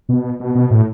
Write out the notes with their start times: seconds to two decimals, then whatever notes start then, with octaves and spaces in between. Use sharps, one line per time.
0.09 B2
0.40 B2
0.55 B2
0.71 A2